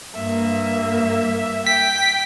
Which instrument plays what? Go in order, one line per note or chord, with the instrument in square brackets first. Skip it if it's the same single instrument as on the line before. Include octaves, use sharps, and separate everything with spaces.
[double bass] G2 A#3 [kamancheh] E5
[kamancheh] G5 [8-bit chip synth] B6